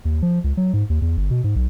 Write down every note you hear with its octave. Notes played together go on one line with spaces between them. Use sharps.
D#2
F3
C#2
F#3
G#2
D#2
E2
G1
B2
G#2
B1